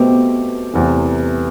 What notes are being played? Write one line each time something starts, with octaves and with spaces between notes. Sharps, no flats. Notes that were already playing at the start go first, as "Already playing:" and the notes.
Already playing: B2 A3 B3 C4 G4
E2 C3 E3 A3